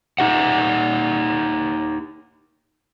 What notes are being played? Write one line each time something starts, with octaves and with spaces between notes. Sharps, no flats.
D#4 G4 F#5